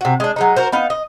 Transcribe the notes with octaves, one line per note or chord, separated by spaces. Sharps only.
C3 F#4
G#3 D4
F#3 G#3 D#4
F#4 A#4 C5
B3 D#4 F5
D#5